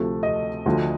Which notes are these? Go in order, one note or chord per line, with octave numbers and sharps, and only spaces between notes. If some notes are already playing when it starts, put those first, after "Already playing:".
Already playing: D2 C3 F3 A3
D#5
D2 D3 F3